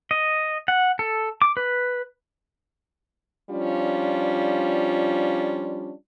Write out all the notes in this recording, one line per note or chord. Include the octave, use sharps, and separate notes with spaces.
D#5
F#5
A4
D6
B4
F3 G3 C#4 D4 F4